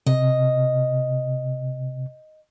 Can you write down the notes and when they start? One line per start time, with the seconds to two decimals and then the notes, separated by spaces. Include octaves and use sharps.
0.06 C3 D#5